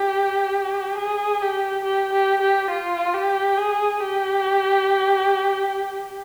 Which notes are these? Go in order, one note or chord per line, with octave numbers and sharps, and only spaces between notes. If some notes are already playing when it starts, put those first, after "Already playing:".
Already playing: G4
G#4
G4
G4
G4
G4
F4
G4
G#4
G4